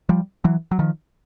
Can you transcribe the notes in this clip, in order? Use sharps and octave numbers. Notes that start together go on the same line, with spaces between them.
F3 G3
E3 F#3
F#3
D#3 F3